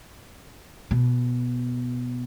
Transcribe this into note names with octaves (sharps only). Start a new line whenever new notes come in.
B2